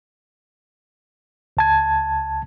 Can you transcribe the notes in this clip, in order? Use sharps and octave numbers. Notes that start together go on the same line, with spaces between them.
C#2 A5 G#6